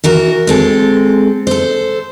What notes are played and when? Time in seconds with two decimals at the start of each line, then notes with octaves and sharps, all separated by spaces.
0.04 E3 F#4 A#4
0.47 G#3 C4 A4
1.47 A4 C5